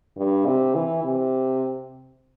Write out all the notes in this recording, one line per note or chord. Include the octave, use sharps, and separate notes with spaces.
G2
C3
E3
C3